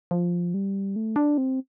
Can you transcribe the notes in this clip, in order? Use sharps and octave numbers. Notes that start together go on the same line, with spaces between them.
F3
G3
A3
D4
C4